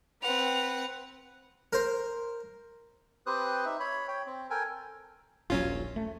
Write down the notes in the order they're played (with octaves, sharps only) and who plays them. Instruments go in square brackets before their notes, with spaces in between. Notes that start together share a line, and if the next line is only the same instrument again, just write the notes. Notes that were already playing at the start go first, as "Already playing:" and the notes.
[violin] C4 F#5 [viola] B4 [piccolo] F7
[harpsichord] A#4 C5
[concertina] C4 G4 B4 C5 D#6 F#6
D#4 E5
C#5 B5
C#5 G5
C4
A4 A#4 G5 G#5
[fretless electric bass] D#1 A#1 [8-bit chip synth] F#3 C#4 F4
[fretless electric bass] A3